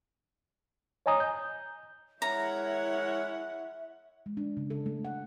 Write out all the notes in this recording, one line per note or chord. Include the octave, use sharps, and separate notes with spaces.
C#5 D#5 G#5 A#5 D#6
G6
G#3 E4 A#4 C#5 E5 F#5 A#5
G#3
D4
C#3
A4
A3
F#5